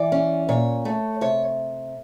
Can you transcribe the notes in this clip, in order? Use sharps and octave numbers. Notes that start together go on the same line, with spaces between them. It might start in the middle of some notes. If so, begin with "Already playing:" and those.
Already playing: E3 D5
C#4
A#2 C#5
A3
C3 C#5